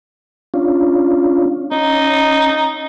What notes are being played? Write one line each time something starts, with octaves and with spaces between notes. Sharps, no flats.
C#4 D4 F4
C#4 D#4